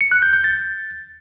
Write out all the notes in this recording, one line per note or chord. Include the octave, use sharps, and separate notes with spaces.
C#7
F#6
G6
G6
A6